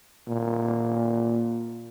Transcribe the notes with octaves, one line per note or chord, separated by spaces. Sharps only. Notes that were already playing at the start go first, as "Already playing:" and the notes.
A#2